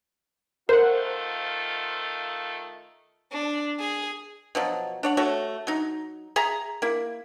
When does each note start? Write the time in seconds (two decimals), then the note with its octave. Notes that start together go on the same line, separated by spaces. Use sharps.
0.69 D#3 A3 F4 A#4 C5 F#5
3.32 D4
3.80 G#4
4.55 B2 F3 F#3
5.03 D4 C#5 F#5
5.17 A3 F#4 C#5
5.67 F#3 D#4
6.36 G#4 E5 G#5 A#5
6.82 A#3 E4